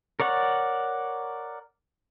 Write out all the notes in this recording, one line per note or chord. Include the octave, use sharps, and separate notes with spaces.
A#4 C#5 D5 F#5